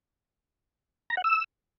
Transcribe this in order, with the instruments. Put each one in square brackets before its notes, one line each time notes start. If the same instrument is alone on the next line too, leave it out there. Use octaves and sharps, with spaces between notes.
[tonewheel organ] A#5
F#5
E6